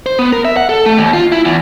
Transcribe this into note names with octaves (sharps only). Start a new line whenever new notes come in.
C5
B3
A#4
E5
F#5
A4
A3
D#2
F4
E4
E2